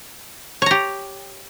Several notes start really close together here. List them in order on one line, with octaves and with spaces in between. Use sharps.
C#5 A#5 G4